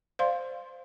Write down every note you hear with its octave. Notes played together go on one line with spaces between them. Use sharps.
C5 D5 F5 C6